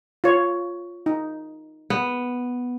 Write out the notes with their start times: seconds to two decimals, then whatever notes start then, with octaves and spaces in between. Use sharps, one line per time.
0.24 F4 C#5
1.06 D#4
1.90 B3